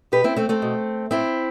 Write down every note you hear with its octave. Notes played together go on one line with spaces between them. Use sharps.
B2 G4 B4
C4 E4
A3 C4
A3 C4
B2
A2 C4 E4